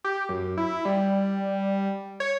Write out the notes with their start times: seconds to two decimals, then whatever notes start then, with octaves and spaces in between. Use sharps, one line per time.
0.04 G4
0.29 F#2
0.57 E4
0.85 G3
2.20 C#5